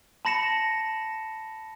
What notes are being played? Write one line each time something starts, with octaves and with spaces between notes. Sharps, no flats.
A5 B5 A#6 C#7 E7